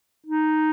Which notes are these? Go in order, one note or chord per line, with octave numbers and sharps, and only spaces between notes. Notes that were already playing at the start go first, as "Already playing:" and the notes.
D#4